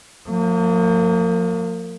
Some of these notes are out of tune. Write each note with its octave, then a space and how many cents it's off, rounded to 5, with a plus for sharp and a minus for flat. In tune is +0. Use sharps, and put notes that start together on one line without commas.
F3 +35 A#3 -35